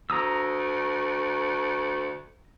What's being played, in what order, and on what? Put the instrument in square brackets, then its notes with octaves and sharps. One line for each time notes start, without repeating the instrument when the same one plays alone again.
[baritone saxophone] D2 [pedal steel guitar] A#5 D#6 E6